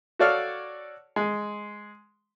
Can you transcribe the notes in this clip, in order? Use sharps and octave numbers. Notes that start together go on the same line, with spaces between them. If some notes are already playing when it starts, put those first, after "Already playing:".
F#4 A4 C#5 D5 F5 F6
G#3